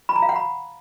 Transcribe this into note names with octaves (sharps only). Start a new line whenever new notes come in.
B5
A#5
F5
F#5
B5